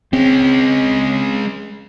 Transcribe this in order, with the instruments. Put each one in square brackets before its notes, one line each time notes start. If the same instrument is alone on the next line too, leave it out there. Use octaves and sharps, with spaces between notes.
[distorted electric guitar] G#3 C#4 [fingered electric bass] C4